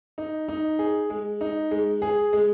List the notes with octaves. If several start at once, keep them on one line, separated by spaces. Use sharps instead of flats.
D#4
D#4
G#4
G#3
D#4
G#3
G#4
G#3